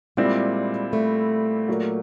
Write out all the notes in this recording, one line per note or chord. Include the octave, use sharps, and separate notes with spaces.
A#2 G3 G#3 C4 E4
A3
A#2 F#3 A#3